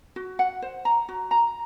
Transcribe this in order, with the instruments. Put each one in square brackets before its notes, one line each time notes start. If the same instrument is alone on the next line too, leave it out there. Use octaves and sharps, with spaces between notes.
[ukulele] F#4
F#5
C5
A#5
F#4
A#5